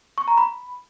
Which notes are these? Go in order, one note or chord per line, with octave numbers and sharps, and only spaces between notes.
C#6
A#5
B5